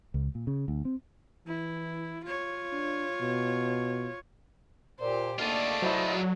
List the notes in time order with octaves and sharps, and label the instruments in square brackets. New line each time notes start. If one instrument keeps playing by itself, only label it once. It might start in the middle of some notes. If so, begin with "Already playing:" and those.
[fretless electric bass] C#2
A#2
C#3
D2
C4
[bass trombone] E3 [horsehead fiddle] E4
[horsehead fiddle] F4 C#5
[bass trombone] D4
B2
[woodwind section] A#2 [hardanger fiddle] G4 C5
[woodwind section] D3 D#3 A#3 [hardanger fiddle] A3 D5 [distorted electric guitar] F4 G#4
[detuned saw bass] F#3 [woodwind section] E4 C5 D#5